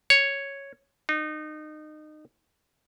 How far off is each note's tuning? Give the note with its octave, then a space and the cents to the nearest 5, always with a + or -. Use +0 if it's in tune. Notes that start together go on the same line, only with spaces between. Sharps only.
C#5 +0
D#4 -25